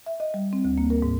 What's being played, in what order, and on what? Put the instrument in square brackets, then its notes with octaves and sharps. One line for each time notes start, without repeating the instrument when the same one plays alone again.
[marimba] E5
D#5
G3
C4
D2
A#3
A#4
G#2